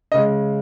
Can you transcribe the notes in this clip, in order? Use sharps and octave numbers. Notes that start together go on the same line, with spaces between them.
C#3 G#3 D#5